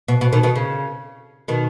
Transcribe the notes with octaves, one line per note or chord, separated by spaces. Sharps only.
B2
B2
B2 D#3
B2 D#3
C#3
B2 D#3